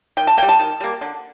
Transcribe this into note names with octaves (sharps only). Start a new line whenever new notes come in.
D#3 G5
A5
A#3 G5
G3
A5
D#3
G3 A#3
D3